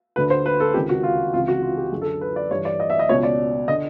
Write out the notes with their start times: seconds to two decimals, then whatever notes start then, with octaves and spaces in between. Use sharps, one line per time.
0.16 D2 D3 B4
0.30 C5
0.46 B4
0.60 A4
0.74 C#2 C3 D#3 G4
0.89 F#4
1.03 F4
1.33 C#2 C3 E3 F4
1.48 F#4
1.62 F4
1.78 G4
1.92 F#2 G#4
1.95 D3
2.02 A4
2.21 B4
2.36 D5
2.51 G2 C#5
2.55 E3
2.65 D5
2.80 D#5
2.90 E5
2.99 D#5
3.09 C#2 B2 C#5
3.23 D5
3.68 D3 D#5